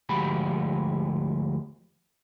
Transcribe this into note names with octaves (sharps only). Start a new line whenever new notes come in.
D2 F3 G#3 F#4 G4 B5